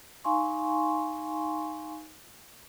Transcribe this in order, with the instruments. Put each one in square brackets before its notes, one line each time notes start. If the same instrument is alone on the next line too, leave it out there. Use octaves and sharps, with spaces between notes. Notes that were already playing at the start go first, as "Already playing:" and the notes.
[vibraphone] D#4 F5 G#5 C6 C#6